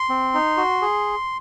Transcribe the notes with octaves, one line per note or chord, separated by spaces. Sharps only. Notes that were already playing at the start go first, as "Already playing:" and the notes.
Already playing: C6
C4
D#4
F#4
G#4